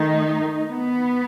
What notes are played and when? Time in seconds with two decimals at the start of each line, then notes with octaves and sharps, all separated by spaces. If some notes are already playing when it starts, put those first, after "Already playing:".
Already playing: D#3 A3 D#4
0.68 B3